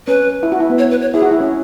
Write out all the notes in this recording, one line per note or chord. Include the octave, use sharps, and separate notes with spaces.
C#4 B4
E4
F#4
E4
B3
C#5
B4
C#5
E4 G#4
F#4
E4
C#4